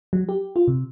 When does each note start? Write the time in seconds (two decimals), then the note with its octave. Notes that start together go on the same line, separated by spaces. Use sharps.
0.13 F#3
0.29 G4
0.56 F4
0.68 C3